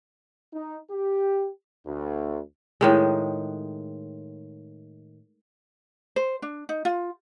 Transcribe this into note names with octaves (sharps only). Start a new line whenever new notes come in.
D#4
G4
D2
A2 D#3 G#3
C5
D4
D#4
F4